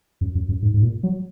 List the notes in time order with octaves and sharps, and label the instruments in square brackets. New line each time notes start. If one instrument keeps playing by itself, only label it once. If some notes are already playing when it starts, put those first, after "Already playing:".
[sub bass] F#2
F#2
F#2
G#2
G#2
A#2
F#3